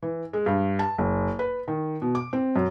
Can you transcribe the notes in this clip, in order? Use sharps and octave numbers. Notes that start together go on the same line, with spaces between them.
E3
G#3
G2
A5
F#1
B4
D#3
B2
D6
C4
F#2